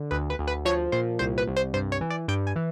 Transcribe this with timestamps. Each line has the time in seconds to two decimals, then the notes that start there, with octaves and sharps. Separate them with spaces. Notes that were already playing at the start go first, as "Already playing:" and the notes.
Already playing: D3
0.11 D2 B4
0.30 B4
0.39 D2
0.48 B4
0.65 F3 C#5
0.92 A#2 C5
1.19 C2 C5
1.38 B4
1.47 C2
1.56 C5
1.74 G2 C5
1.92 C#5
2.01 E3
2.10 D5
2.28 G2 G5
2.47 G#5
2.56 E3